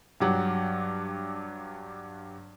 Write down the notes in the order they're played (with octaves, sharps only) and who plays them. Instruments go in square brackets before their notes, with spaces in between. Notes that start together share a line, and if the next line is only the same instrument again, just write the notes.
[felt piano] G2 F#3 G4 F#5